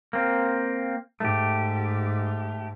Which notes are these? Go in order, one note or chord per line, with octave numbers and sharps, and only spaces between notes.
A#3 C4
G#2 A3 G4